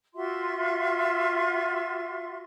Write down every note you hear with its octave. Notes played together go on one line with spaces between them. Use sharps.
F4 F#4 E5 C6